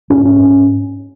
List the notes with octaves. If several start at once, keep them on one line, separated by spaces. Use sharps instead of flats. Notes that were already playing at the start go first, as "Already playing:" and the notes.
G#2 C#4
C#4
G#2